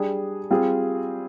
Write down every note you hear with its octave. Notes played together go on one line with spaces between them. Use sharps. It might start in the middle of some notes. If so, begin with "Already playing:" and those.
Already playing: G3 D4 G#4
G3 C4 F4 G#4